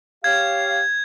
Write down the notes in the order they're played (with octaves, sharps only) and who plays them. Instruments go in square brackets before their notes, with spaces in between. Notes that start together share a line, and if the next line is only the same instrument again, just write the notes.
[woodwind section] G4 C#5 F5 [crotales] G#6